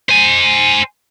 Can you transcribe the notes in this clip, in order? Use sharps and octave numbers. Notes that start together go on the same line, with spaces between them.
C5 G#5